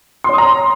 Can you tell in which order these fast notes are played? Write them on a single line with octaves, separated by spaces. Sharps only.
C6 C#5 D#6 A#5